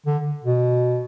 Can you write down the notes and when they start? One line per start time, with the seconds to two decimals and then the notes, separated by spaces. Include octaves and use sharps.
0.06 D3
0.44 B2